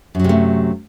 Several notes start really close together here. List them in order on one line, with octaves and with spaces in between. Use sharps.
F#2 F#3 C3 A3